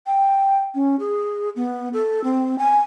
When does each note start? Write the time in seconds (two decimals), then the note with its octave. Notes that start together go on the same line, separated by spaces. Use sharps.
0.07 G5
0.75 C#4
1.00 G#4
1.56 B3
1.93 A4
2.24 C4
2.59 G#5